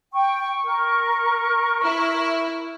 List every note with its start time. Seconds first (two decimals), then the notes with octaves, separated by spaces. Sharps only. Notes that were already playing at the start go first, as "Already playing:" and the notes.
0.13 G5 C#6
0.64 A#4
1.84 E4